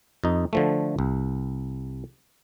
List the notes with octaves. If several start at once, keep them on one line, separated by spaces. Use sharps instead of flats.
F2 D#4
D3 F3 A3
C2